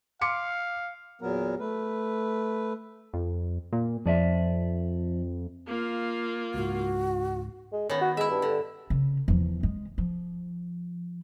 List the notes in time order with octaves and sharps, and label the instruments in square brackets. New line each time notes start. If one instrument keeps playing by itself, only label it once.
[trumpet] F5 [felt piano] C6 D6 C#7
[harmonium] E2 A#2 F#3 B3 A#4
A3 B4
[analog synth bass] F2
A#2
[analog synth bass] F2 [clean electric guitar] F3 D5 E5
[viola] A#3 F4
[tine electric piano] C#2 G#2 [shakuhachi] F#4
[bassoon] G#3
[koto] D#3 B3 [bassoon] C#4
[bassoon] F#4
[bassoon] G#3 [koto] E4 E5
[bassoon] G2
[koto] D3
[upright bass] C#3
E2 F3
G#3
F3